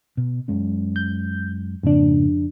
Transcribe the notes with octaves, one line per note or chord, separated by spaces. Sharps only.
B2
F#2 G#3 C#4
G6
F2 G#2 C#3 A#3 D4